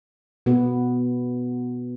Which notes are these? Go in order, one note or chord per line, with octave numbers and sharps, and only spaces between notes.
B2 B3